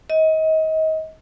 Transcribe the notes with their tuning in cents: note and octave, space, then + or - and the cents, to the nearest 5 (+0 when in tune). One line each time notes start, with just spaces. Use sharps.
D#5 +30